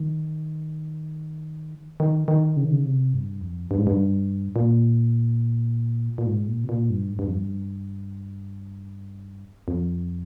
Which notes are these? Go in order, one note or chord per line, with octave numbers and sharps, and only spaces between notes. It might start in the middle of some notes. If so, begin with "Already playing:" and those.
Already playing: D#3
D#3
D#3
C#3
D#3
C#3
C3
G2
F2
G2
G#2
G2
A#2
A#2
G#2
A#2
C3
A#2
G2
G#2
G2
F2
G2
F2